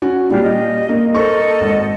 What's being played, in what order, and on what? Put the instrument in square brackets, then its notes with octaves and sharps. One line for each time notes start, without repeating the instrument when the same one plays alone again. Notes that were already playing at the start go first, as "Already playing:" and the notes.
[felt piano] C#4 F#4
[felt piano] A#2 G3 [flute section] D4 F4 G4
[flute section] D#5
[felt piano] A#3
[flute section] A4 D#5 [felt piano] A#4 C5 C#6
[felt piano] G#1